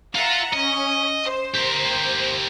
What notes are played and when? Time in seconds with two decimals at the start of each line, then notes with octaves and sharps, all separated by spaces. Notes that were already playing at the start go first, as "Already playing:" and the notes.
0.15 F4 E5 F#5 A#5
0.53 C#4 D#5
1.25 C5
1.54 G4 A#4